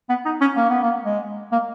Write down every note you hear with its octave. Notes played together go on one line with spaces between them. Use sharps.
B3
D#4
C#4
A#3
B3
A#3
G#3
A#3